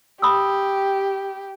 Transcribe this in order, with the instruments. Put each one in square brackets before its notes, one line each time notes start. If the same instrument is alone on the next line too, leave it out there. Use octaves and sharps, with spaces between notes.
[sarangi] G4 [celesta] B5 D#6 E6